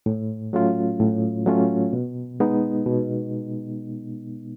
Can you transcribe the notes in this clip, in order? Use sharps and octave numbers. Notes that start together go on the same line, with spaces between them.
A2
F#3 A3 C#4 F4
A2
F#3 A3 C#4 F4
B2
G#3 B3 D#4
B2